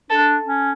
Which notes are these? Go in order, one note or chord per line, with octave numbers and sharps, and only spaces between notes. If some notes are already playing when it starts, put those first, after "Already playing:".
D4 A4
C#4